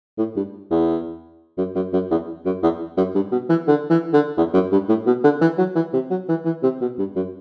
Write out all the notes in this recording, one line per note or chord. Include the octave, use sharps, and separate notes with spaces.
A2
G2
E2
F#2
F#2
F#2
E2
F#2
E2
F#2
G2
B2
E3
D3
E3
D3
E2
F#2
G2
A2
B2
D3
E3
F#3
E3
C3
F#3
E3
E3
C3
B2
G2
F#2